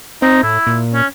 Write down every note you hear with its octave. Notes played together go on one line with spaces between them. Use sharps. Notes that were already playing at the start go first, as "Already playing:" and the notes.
C4 D#4
A2 E4
A#2
C#4